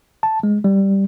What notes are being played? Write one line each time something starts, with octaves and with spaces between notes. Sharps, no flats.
A5
G#3
G3